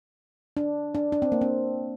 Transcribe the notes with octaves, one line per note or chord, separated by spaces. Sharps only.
D4
D4
D4
C4
A#3
C4